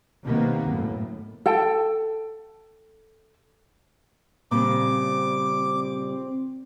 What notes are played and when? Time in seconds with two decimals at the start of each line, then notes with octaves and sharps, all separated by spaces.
0.23 C3 D#3 A#3 B3
0.68 F#2 A2
1.46 A4 G5 A5
4.51 A#2 C#3 G3 C4 D6